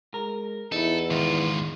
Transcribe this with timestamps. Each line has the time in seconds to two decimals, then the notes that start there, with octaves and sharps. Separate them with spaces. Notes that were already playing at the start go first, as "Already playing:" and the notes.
0.14 G#3 A#4
0.72 E2 D#4 E4 A4
1.10 G#2 D#3 F4